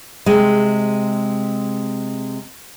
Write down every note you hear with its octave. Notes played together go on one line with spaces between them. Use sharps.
C3 G#3